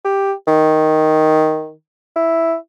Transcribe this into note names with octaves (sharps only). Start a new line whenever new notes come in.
G4
D#3
E4